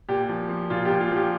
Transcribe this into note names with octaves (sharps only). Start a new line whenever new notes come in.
A#2 G4
F3
F3
A#2 F4
G4
A#2
F4
F3 G4